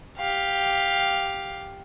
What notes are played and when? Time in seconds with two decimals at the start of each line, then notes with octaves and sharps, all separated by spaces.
0.18 G4 F5